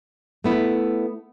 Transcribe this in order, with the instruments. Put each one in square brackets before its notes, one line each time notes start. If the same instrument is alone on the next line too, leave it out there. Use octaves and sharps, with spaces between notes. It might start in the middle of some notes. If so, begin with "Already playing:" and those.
[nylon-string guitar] A3 B3 E4